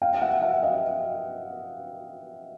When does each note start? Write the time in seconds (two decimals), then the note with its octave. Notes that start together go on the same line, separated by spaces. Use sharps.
0.02 F5 G5
0.14 F5
0.22 E5 F#5
0.42 E5 F#5
0.63 D#5 F5